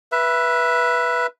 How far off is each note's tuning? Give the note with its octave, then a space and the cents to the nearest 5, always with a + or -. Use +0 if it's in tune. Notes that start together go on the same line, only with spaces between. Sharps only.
B4 -10 E5 +15